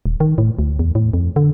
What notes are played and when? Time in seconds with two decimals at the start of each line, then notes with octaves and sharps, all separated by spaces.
0.06 D#1
0.20 D#3
0.38 A2
0.59 D2
0.79 E2
0.95 A2
1.13 F2
1.36 D3